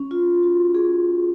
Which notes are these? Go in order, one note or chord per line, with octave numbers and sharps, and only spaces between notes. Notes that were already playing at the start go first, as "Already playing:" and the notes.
Already playing: C#4
F4
F#4
G#4